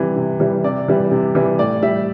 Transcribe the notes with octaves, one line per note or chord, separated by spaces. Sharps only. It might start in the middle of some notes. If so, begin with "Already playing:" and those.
Already playing: C3 E3 G3
C3
E3 G3
C3 D5
E3 G3
C3
E3 G3
A2 D5
G3 E5